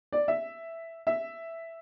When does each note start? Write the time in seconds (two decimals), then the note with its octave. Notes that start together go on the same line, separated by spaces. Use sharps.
0.12 D5
0.28 E5
1.07 E5